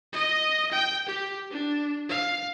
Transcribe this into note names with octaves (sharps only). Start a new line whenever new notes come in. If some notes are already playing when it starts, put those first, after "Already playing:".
D#5
G5
G4
D4
F5